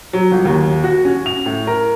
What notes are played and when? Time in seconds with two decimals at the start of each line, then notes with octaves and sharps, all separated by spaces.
0.13 F#3
0.32 G1
0.45 D#2
0.84 F#4
1.05 C#4
1.26 F7
1.46 A2
1.67 A#4